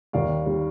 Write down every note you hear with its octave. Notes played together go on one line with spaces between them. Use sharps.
D#2 D#3 G3 D5 F5
D#3 G3